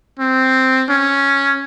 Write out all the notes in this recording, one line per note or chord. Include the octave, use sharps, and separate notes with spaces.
C4
C#4